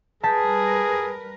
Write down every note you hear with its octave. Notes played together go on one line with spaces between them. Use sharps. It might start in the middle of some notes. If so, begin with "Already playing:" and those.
G3 G#4 A#4 B4 A5 G6 B6